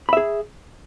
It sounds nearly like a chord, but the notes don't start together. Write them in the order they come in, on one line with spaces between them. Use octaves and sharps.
B5 E5 G#4